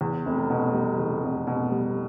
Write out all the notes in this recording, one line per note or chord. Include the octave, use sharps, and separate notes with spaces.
E2
F1
B2
G3
E2
F1
B2
G3